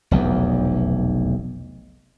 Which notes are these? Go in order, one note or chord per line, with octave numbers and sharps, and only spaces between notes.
F1 B1 E2